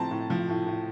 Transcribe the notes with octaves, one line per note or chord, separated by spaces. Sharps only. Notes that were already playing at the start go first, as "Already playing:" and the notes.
Already playing: A2 F3 C4 A5 A#5
A2
F3
A2
A2